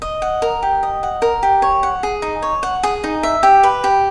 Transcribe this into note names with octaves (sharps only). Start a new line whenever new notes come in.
D#5
F#5
A#4
G4
D#5
F#5
A#4
G4
C#5
F#5
G#4
D#4
C#5
F#5
G#4
D#4
E5
G4
B4
G4